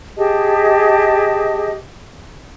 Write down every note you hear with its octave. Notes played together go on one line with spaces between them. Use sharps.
G4 G#4 D#5 A5